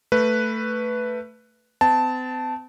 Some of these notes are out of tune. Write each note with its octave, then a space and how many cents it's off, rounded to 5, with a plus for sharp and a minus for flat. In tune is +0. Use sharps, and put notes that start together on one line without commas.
A3 +15 B4 +0
C4 -45 A5 +0